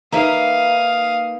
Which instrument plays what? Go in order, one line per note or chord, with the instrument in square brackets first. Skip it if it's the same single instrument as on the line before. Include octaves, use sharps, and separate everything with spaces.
[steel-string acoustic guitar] A#3 D#4 B4 [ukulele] E5 A#5 [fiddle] F5 D#6